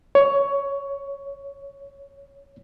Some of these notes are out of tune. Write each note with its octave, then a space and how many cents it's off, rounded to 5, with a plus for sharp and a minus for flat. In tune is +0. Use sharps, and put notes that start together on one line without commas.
C#5 +15